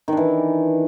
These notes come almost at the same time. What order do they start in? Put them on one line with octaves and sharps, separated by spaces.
D#3 D4 E3